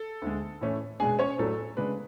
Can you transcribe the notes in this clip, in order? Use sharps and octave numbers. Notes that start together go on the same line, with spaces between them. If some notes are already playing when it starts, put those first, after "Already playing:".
Already playing: A4
D2 D3 G#3
A2 E3 A3 C#4
B2 G#3 D4 G#4 G#5
C#4 C#5
A2 F#3 A3 D4 A4
C#3 G#3 D4 B4